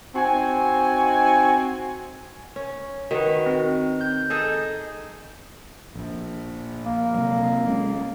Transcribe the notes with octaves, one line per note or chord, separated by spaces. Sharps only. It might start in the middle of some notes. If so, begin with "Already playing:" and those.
C4 D#4 F#4 G#5
C#4
D#3 F#4 B4
C4
G6
D#4 G#4 A4
A#1 A#2
A#3
C3 F#3
G#3 C#4